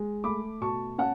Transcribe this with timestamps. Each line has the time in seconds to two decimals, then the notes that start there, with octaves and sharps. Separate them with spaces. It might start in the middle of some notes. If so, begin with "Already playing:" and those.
Already playing: G#3
0.24 A3 B5 D6
0.61 B2 A5 C#6
0.98 C#4 F#5 A5